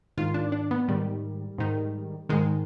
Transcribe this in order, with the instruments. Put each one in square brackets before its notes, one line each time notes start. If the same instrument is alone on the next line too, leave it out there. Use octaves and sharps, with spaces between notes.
[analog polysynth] G#2 D#3 F4
D4
D4
B3
G#2 D#3 G3
G#2 D#3
G#2 D#3 G#3